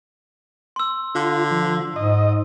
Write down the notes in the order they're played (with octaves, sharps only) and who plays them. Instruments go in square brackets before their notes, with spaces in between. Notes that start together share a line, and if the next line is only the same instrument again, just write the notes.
[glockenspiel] C6 E6
[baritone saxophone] D3 [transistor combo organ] F4
[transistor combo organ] F3
[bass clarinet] G#2 [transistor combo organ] D#5